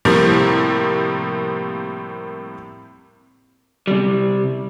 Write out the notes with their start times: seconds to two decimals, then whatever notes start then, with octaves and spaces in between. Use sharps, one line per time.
0.05 A2 C3 F3 G3 A#3
3.87 C3 G3